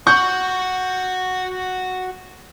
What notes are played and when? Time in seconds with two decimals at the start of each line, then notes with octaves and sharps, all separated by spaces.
0.07 F#4 F#5 C#6 G6